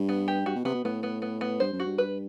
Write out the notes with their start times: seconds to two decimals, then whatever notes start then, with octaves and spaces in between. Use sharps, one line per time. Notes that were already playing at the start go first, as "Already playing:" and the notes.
Already playing: G2
0.09 B3
0.28 G4
0.46 G2 F#4
0.56 B2
0.65 C3 B3
0.75 B2
0.84 A2 B3
1.03 B3
1.22 B3
1.41 B3
1.60 G2 C5
1.73 F#2
1.80 F#4
1.86 G2
1.98 B4